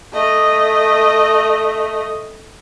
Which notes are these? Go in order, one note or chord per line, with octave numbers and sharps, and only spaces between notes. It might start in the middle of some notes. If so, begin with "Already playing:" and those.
A3 D#5